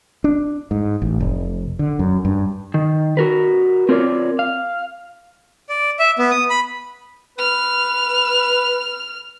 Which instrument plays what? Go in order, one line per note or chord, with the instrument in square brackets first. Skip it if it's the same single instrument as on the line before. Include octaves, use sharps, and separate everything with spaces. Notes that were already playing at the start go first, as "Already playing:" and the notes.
[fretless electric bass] D4
G#2
A1
F1
D3
F#2
G2
[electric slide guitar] D#3
F#4 A#4 B4
C4 F4 A#4 C#5 D5
F5
[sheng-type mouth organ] D5
E5
B3
D#6
B5
[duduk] B4 [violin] F6